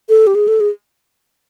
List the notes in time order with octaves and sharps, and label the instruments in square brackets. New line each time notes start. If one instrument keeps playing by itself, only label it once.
[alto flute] A4
G4
G#4
A4
G#4